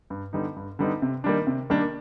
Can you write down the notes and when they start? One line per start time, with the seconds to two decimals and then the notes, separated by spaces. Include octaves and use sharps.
0.10 G2
0.33 D3 G3 B3 D#4
0.56 G2
0.79 D3 G3 B3 D#4
1.02 C3
1.24 D#3 G3 A#3 D4
1.47 C3
1.70 D#3 G3 A#3 D4